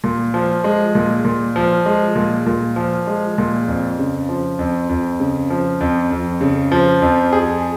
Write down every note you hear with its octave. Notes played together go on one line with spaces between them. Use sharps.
A#2
F3
G#3
A#2
A#2
F3
G#3
A#2
A#2
F3
G#3
A#2
F2
C#3
F3
F2
F2
C#3
F3
F2
F2
C#3
F3
F2
G#4